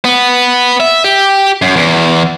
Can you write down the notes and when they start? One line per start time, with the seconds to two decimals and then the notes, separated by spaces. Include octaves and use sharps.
0.04 B3
0.80 E5
1.04 G4
1.62 F#2
1.76 E2